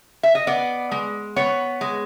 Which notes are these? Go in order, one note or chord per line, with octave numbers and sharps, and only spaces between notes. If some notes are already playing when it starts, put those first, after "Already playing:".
E5
D#5
B3 D5
G#3
B3 C#5
G#3